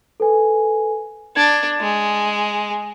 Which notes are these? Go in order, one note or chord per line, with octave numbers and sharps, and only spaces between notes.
A4 B4 G#5
D4 G#6
G#3